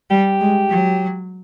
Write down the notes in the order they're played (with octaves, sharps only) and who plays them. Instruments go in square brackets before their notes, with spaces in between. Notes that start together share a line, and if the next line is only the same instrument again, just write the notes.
[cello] G3 [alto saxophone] G4
[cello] G#3
F#3